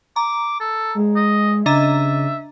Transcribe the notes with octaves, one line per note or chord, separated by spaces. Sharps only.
A#5 D6
A4
G#3
D#5
C#3 D4 D#5 E5 A#5